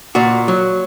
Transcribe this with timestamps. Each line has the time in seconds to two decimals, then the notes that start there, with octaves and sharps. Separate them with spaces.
0.15 A#2 F#4
0.48 F#3